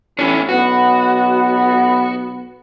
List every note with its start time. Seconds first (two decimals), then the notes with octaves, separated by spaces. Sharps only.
0.19 A1 E3 C#4 D4
0.49 B1 B3 F#4